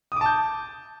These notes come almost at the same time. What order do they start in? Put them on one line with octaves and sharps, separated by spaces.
D#6 D6 A5 G6